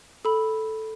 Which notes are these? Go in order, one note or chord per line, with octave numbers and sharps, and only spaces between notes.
A4 B5